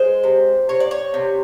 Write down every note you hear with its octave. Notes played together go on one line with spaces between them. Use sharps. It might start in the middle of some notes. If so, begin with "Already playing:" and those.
Already playing: G#3 C5
C3
C3 C#5
D5
C#5
C3